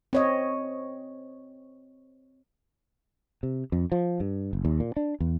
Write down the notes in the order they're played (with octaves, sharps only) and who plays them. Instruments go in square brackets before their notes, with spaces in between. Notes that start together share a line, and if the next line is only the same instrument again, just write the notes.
[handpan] C4 C#5 D#5
[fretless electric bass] C3
F2
F3
G2
F#1
D#2
A#2
D4
E2